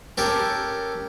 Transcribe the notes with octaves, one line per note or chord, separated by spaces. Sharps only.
C#4 G4 A4 A#4